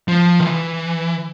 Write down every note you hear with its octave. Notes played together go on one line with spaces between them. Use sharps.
F3
D#3
E3